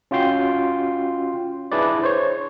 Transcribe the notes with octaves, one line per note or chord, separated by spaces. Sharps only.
C#4 F4 F#4 G5 C6
D4 E4 G#4 B4 D5
C5 C#5